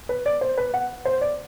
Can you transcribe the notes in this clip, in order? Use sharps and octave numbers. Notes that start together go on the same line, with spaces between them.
B4
D5
C5
B4
F#5
C5
D5